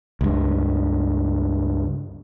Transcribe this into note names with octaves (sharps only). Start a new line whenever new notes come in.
C#2 G2